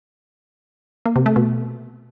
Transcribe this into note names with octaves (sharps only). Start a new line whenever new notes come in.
A#3
C3
A3
B2